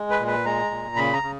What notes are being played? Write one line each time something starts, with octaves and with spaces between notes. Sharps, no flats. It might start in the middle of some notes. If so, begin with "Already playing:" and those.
Already playing: G#3
B4
A#2
B4
G#3 A#5
A#2
C#3 B5
A#5
C#3